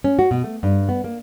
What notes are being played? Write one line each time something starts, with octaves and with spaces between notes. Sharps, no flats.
C#4
F#4
B2
A3
G2
B3
A#3